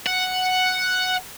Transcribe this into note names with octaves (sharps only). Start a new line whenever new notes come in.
F#5